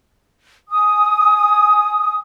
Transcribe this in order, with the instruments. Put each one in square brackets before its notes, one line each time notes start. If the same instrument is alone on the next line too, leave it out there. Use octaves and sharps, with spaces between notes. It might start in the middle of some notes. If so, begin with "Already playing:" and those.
[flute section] G#5 D#6